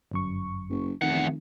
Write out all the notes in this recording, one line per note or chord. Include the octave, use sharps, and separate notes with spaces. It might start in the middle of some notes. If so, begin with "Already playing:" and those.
G1 F#2 C#6
F#1
F1 E2 D#3 F#5